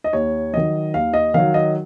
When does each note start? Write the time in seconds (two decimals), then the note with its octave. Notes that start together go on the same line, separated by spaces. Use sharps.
0.04 D#5
0.13 D#2 C#5
0.53 D#3 F#3 D#5
0.94 D#2 F5
1.14 D#5
1.34 D#3 F#3 F5
1.54 D#5